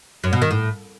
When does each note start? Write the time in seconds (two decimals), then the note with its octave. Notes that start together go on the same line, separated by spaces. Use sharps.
0.24 F#2
0.33 B2
0.42 D#3
0.51 A2